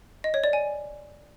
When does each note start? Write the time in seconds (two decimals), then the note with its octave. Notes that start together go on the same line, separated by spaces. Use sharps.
0.24 D#5
0.34 C#5
0.44 D5
0.53 G#5